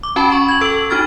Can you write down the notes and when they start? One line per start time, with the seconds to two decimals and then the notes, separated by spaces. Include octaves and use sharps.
0.03 D6
0.16 C#4 F#4 G5 A5 B5
0.30 B5 C#6
0.48 G#6 F#7
0.61 A4 E6 D7 F#7
0.90 D4 D#4 F#4 F6 A6